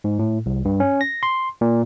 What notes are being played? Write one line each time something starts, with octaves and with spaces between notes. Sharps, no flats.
G#2
A2
C2
G2
C#4
A#6
C6
A#2